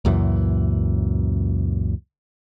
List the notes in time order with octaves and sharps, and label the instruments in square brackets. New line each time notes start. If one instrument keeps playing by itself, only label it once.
[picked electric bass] C#2 F#2 A#2 E3